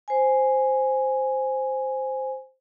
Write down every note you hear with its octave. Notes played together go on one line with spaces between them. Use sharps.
C5 G#5